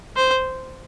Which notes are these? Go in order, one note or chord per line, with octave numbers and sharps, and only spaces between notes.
C5